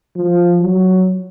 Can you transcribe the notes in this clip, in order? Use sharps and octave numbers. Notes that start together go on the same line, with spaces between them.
F3
F#3